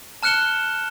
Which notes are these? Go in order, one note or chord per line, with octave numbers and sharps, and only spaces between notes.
A5 F6 F#6 C#7 E7 G7